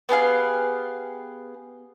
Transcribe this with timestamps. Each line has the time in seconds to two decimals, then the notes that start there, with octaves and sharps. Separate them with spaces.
0.09 B3 G4 G#4 F5